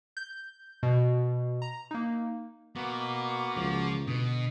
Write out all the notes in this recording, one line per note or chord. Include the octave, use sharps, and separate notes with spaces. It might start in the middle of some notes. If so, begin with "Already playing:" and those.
G6
B2
A#5
A#3 D#4
B2 A#3 F#4 D6
C#2 F3
B2 D3 D#6